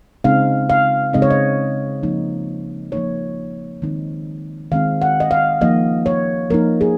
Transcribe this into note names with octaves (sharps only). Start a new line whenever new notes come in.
C#3 G#3 C4 D#4 F5
F5
C#3 G#3 C4 D#4 D#5
C#5
D#5
F3 A#3 D#4
F3 A#3 D#4 C#5
D#3 G#3 C4 D#4
D#3 G#3 C4 D#4 F5
F#5
D#5
F5
F3 A#3 D#4 D#5
C#5
F3 A#3 D#4 A#4
G#4